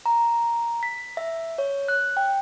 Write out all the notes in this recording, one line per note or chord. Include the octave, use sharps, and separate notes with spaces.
A#5
B6
E5
C#5
F#6
G5